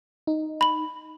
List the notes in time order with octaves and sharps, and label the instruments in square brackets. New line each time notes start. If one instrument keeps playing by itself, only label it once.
[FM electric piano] D#4
[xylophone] B5 F#7